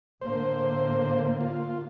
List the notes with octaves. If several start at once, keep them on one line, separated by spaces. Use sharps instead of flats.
A2 D3 A#3 C5
F4